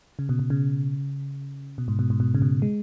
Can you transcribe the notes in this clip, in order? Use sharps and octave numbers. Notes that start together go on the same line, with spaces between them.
C#3
B2
B2
C#3
B2
G#2
B2
G#2
B2
C#3
B2
G#3